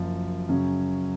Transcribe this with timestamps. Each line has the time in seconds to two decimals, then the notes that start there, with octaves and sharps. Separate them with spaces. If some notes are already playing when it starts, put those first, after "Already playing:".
Already playing: F#1 F#2 F3
0.49 F#2 C#3 F#3 C#4